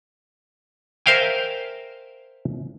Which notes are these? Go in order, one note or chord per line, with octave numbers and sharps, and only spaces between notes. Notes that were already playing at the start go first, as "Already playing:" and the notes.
A#4 C5 E5 F5 G5 G#5